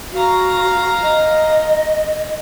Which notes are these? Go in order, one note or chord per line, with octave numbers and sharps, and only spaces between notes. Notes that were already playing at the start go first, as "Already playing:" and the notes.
F#4 F5 A#5
D#5